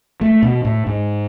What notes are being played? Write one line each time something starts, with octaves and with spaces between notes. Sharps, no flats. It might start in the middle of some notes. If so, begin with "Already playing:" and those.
A3
B2
A2
G#2